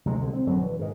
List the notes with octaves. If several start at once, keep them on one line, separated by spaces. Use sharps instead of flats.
D2 C3 G3 G#3
C2 D3
C4
A#1 F#2 D3 F#3
E3
G#2 D#3